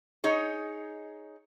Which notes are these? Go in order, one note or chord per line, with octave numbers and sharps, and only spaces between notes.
D#4 G#4 C#5